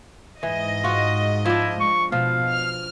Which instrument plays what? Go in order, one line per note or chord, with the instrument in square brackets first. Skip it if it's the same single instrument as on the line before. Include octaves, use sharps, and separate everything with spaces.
[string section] G#2 D#5 [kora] E3
[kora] F4 F#4
[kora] F3 D4 [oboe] E4
[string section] G#3 [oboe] C#6
[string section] B2 [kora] F3 [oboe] F5
[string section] F6